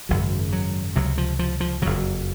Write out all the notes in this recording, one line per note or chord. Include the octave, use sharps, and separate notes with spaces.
G#1 F#2 C#3 F#3
F#3
C#2 C3 F#3
F3
F3
F3
F#1 F2 C#3 F#3